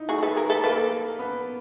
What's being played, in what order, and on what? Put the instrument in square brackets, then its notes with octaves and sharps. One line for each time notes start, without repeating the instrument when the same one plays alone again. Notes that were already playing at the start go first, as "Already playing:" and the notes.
Already playing: [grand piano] D#4 E4
[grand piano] A3 [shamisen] F#4 G#4
[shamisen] A4 B4
G#4 A#4
A4 B4
[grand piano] A#3 [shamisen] A4 B4
[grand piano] B3